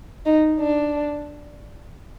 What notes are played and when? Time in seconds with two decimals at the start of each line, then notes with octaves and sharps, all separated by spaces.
0.26 D#4
0.60 D4